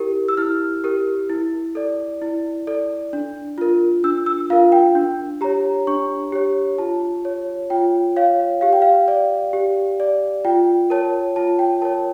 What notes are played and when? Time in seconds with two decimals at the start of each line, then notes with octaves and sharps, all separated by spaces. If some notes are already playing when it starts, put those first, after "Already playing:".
Already playing: E4 G4 A#4
0.28 E6
0.37 E4 F6
0.84 G4 A#4
1.29 E4
1.75 A4 D5
2.22 E4
2.67 A4 D5
3.13 D4
3.58 F4 A#4
4.04 D4 E6
4.26 E6
4.50 F4 A#4 F5
4.72 G5
4.95 D4
5.41 G4 C#5 A#5
5.87 D4 C#6
6.32 G4 C#5
6.78 F4 A5
7.25 C#5
7.70 F4 G5
8.16 C#5 F5
8.61 G4 F5
8.73 G5
8.82 F5
9.08 D5
9.53 G4
10.00 D5
10.45 F4 G5
10.90 A#4 C#5 A5
11.36 F4 A5
11.59 G5
11.82 A#4 A5
11.85 C#5